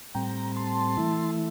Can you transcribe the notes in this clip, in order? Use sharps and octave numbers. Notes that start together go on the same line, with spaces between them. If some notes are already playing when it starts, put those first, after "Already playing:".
A2 G3 C4 G5 A#5
A5 C6
E3 A3 E4